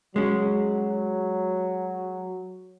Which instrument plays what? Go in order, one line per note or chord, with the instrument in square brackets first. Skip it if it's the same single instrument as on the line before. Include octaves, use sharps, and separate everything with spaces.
[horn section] F#3 [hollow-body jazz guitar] G#3 C#4